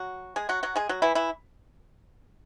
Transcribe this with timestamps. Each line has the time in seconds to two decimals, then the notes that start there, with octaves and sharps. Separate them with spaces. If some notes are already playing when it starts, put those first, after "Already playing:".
Already playing: F#3 F#4
0.36 G#3 G#4
0.49 F#3 F#4
0.63 F#3 F#4
0.76 G#3 G#4
0.89 F#3 F#4
1.02 E3 E4
1.15 E3 E4